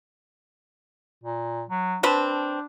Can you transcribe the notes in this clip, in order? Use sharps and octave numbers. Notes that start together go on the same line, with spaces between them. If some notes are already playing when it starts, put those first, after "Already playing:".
A#2
F#3
C4 D4 B4 A5